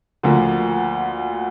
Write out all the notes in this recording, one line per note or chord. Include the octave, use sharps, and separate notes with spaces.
D2 D3 F3 A#3